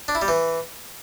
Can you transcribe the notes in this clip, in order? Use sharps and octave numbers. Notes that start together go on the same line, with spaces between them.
D4
E4
G3
E3